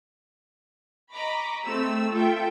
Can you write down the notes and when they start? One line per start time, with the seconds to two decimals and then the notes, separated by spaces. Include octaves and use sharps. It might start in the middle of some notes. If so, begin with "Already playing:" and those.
1.13 D#5 A#5 B5 C#6 D6
1.64 A3 C4 E6
2.12 F4 A4 E5 G5